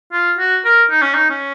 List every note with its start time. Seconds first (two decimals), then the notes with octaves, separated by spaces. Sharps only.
0.13 F4
0.38 F#4
0.65 A#4
0.90 D#4
1.02 C#4
1.14 D#4
1.30 C#4